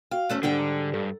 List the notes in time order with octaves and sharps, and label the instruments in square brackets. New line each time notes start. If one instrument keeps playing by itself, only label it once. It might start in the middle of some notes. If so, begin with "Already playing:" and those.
[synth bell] F#4 G5 [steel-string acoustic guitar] F5
[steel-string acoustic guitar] E2 A3 C#4 [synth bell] F#6
[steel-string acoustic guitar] G#2 G3 G5 [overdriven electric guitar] D3 [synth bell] D4 F#5
[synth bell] A#5
[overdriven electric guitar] G2 [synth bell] A4